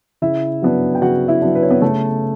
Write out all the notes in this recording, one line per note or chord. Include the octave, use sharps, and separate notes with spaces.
C#3 E4 E5
F#3 B3 D4
G5
C#3 F#4 F#5
E4 E5
F#3 B3 D4
B4
C#5
B3 B4
C#3 A3 A4